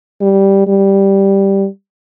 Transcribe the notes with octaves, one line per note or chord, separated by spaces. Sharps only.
G3
G3